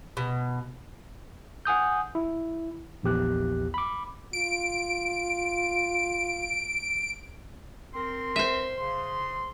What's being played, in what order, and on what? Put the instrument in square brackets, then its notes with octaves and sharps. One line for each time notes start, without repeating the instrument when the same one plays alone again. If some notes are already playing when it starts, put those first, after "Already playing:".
[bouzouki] B2
[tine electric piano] F#5 G#5 D#6 G6
E4
A#1 E2 G4 F#6
B5 D6
[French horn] F4 [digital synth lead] D7
[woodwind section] C4 A#4 C6
[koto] C5 E5
[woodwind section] C#3 C6